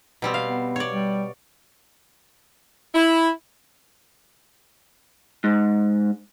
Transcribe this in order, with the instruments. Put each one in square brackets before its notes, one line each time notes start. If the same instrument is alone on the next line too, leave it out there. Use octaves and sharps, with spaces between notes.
[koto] B2 G3 C4
F5
[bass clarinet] B3
[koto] C#5 D5
[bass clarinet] G3
[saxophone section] E4
[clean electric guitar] G#2